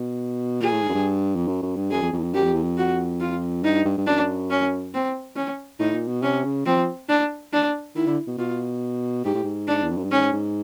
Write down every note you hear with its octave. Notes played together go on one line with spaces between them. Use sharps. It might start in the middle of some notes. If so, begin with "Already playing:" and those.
Already playing: B2
A#2 G#4
A2
G#2
F#2
G2
F2
F#2
F#2
G2
F#2 G#4
F2
F2
E2
F2
F#2 G4
F2
E2
F2
F#4
F4
G2 D#4
G2
G2
F#2 D4
C#4
C4
C#4
A2 D#4
A#2
B2
C3 C#4
C#3
F3 C4
D4
D4
D#3 E4
D3
B2
B2 F4
G#2 G4
A2
G#2
D4
E2
F2
F#2
G2
G#2 C#4
G#2